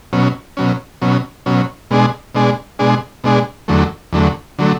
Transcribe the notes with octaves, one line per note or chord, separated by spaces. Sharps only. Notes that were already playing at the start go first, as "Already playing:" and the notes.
B2 F#3 C#4
B2 F#3 C#4
B2 F#3 C#4
B2 F#3 C#4
B2 G#3 D4 G#4
B2 G#3 D4 G#4
B2 G#3 D4 G#4
B2 G#3 D4 G#4
E2 D3 F#3 A3
E2 D3 F#3 A3
D3 F#3 A3